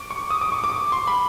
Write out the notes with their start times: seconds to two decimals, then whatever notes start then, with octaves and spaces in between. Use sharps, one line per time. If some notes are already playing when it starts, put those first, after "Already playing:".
Already playing: C#6 D6
0.11 C#6
0.30 D#6
0.41 D6
0.52 C#6
0.64 D6
0.92 C6
1.07 B5